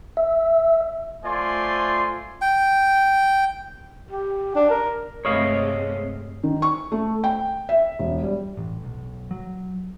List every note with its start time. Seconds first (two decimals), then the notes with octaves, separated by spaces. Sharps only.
0.17 E5
1.24 A3 F4 C5 D5 G#5 C6
2.41 G5
4.11 G4
4.55 D4
4.70 A#4
5.25 G2 C3 G#3 A3 C#5 D#5 F5
6.43 D#3
6.62 C#6
6.92 A3
7.24 G5
7.69 E5
7.99 E1
8.23 G3
8.57 A1
8.83 B1
9.31 F#3